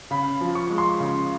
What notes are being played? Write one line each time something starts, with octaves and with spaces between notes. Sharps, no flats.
C#3 B5
F3
C#6
G#3
C6
C#3